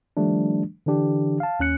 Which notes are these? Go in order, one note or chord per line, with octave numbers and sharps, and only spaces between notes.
D#3 F3 G3 A3 D4
D3 E3 D4 G4
F5 A5
D#2 C#4 F#6 C#7